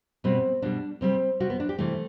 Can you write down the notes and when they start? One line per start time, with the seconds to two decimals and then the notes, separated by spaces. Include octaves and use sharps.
0.24 B2 G3 C4
0.62 B2 G3 D4
1.01 C3 G3 C4
1.40 C3 G3 F#4
1.50 B3
1.60 D4
1.69 G4
1.78 C3 E3 G3 A3